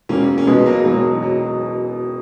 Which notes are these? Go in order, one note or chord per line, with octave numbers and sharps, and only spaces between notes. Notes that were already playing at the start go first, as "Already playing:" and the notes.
E1 A#3 C#4
C#4
B2 G#3 B3
F#3 A#3
E1 F#3
F#3